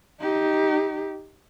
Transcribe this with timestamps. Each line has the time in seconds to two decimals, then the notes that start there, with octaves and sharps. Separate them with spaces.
0.20 D#4 G4